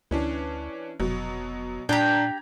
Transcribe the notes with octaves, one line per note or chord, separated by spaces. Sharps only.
D2 E3 C#4 D4
F1 B2 F#3
A#2 D4 G4 G5 A#5 G#6